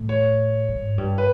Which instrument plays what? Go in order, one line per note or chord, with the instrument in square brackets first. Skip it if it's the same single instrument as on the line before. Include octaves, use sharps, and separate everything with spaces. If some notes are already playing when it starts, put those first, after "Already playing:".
Already playing: [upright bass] A2
[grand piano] C#5
[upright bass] G#2
G2
[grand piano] B4